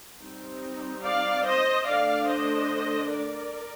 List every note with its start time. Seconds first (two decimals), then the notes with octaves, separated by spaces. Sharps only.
0.20 G3 C4 D#4
1.03 D5 F5
1.44 C5 D#5
1.85 D3 A3 D4 D5 F5
2.26 C5 D#5
3.09 A#4 D5